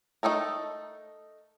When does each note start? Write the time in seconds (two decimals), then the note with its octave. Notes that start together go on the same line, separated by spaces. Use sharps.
0.23 A3 C#4 D#4 A4 A#4